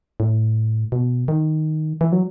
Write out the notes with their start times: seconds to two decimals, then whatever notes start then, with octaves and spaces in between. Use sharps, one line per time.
0.20 A2
0.92 B2
1.28 D#3
2.01 E3
2.12 F#3